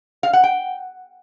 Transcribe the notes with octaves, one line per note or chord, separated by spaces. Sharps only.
F5
F#5
G5